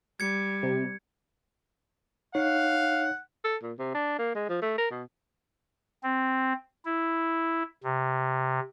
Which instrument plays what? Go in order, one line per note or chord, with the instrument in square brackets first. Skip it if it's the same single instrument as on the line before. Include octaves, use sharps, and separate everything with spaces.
[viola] G3 [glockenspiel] G#6 C#7
[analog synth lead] C3
[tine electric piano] D#4 C#5 [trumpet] F5 [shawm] F#5
[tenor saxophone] A4
A#2
C3
D4
A#3
G#3
F3
A3
A#4
B2
[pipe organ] C4
E4
C3